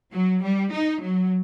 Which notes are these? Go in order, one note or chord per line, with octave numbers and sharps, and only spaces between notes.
F#3
G3
D#4
F#3